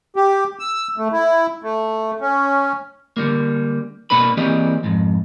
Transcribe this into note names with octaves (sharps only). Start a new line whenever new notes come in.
G4
E6
A3
E4
A3
C#4
D3 G3 A#3
B2 A#3 D4 B4 B5
E3 A#3 C4 G4 D5 D#5
F2 G#2